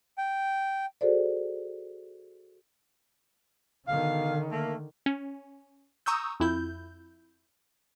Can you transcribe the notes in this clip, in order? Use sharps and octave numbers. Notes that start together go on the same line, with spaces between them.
G5
F#4 G#4 A4 C5 D5
B2 D3 D#3 F5
A3 A#3
C#4
A#5 C#6 D#6 E6 G6
F2 E4 G6